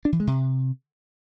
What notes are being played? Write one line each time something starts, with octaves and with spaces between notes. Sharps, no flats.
D4
E3
G#3
C3